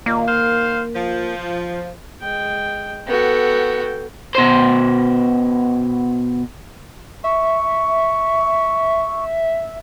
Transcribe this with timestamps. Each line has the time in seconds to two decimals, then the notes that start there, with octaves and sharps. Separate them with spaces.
0.06 A#2 D#3 A#3
0.28 D#3 C5 F5
0.95 F3
2.21 G#3 G5
3.07 B3 F#4 A4 G5
4.35 B2 C5
7.24 E5 C#6